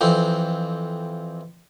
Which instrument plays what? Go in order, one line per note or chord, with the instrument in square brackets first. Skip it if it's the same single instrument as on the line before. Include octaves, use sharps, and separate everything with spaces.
[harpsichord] F2 E3 C4